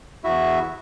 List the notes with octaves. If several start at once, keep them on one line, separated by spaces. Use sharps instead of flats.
E2 E4 F#4 E5